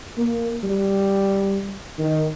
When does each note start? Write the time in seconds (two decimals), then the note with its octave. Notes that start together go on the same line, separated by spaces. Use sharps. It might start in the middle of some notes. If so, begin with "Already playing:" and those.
0.17 A#3
0.63 G3
1.98 D#3